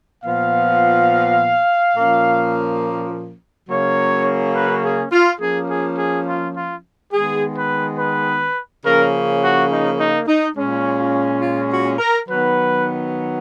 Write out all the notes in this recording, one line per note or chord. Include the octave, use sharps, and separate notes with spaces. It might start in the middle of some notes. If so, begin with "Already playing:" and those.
A#2 F3 B3 F5
A#2 F3 A#3 C#4
C#3 F#3 A#3 C#4 C#5
B4
G#4
F4
F3 A#3 C#4 G#4
G#4
G#4
F4
F4
D#3 G#3 B3 G#4
B4
B4
C#3 F3 A#3 C#4 A#4
F#4
D#4
D#4
D#4
A#2 G#3 C#4
F4
F4
F#4
A#4
D#3 F#3 B3 B4